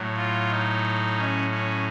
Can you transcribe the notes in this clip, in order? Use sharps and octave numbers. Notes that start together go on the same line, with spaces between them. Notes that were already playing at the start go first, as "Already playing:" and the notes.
Already playing: A2 F#3
F4
D#4
C#4
C#4